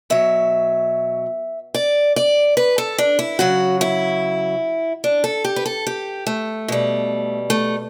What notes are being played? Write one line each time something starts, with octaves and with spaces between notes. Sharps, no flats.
B2 F#3 E5
D5
D5
B4
A4
D4
E4
C#3 F#3 F#4
E4
D4
A4
G4
B4
A4
G4
A3
B2 G3
A3